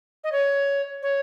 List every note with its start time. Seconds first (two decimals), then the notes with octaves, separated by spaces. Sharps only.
0.24 D#5
0.32 C#5
1.03 C#5